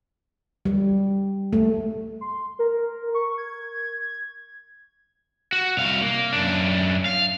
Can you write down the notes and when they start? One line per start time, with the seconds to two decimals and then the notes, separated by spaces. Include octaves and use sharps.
0.65 G3
1.53 A3
2.21 C6
2.59 A#4
3.15 C#6
3.38 G#6
5.52 F#4
5.77 C2 F5
6.02 A#3
6.32 F#2 D4
7.06 F5